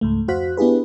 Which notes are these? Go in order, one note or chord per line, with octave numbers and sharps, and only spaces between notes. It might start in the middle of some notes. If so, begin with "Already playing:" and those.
C#2 G#2 A3
F2 F#4 C5 F5 F#6 B6
B3 D4 E4 G4 G#4 B4